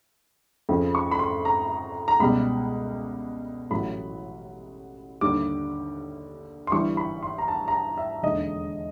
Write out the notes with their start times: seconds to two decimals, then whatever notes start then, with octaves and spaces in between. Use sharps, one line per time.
0.69 F2 C#3 F3
0.95 C#6
1.11 B5
1.19 C6
1.45 A#5
2.08 A#5
2.20 C#2 B2 G3 B5
3.70 A1 A2 F#3 B5
5.21 D#2 D3 G3 D6
6.67 C6
6.72 G1 G2 E3 G3 C#6
6.97 B5
7.23 C6
7.38 A#5
7.48 A5
7.68 A#5
7.72 A5
7.98 E5
8.23 E1 D#2 D3 D#5